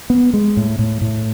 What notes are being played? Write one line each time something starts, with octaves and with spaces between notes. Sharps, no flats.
B3
G#3
A2
A2
A2